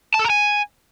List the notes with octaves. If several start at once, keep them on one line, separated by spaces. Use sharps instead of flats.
A5
A4
A#5
G#5